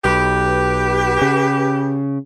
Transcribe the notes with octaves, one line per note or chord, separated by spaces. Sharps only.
B1 G4 B4
C#3